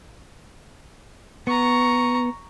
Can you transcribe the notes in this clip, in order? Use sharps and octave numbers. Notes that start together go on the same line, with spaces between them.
B3 A#5 C#6